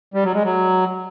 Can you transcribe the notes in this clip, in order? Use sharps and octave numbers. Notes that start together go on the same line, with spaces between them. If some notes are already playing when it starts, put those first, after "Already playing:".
G3
F#3
G#3
F#3